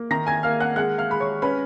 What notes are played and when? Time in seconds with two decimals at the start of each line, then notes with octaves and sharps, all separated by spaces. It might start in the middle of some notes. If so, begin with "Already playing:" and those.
Already playing: A#3
0.11 D#3 A#5 A#6
0.27 G#5 G#6
0.43 A#3 F5 F6
0.60 F#5 F#6
0.76 G#3 F#5 F#6
0.98 F5 F6
1.10 G#3 B5
1.20 C#5 C#6
1.42 C#4 B4 B5